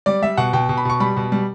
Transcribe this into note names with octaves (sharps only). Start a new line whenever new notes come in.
G3 D5
G3 E5
B2 F#5
B2 G5
B2
B5
B2 C#6
G3 B5
B2
G3